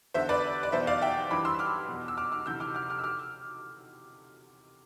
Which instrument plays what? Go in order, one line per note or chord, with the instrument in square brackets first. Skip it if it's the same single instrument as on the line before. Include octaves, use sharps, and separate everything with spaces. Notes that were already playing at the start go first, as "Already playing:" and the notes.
[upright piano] E2 D3 C5 E5
B4 D5
D5
E2 B2 C5 E5
D5 F5
E5 G5
G2 E3 B5 D6
C6 E6
D6 F6
E2 B2
E6
D6 F6
D6 F6
D2 C3 E3 E6 G6
D6 F6
D6 F6
D6 F6
E6
D6 F6